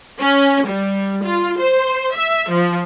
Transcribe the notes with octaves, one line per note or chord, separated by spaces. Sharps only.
C#4
G3
F4
C5
E5
F3